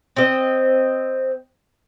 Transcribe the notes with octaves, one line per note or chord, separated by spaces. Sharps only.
C4 D#5